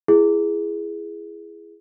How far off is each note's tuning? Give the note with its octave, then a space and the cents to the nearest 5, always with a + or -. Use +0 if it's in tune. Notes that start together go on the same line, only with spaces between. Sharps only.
E4 +25 G#4 +5